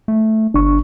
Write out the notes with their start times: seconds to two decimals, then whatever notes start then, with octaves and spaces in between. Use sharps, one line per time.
0.08 A3
0.54 G1 D4 C#6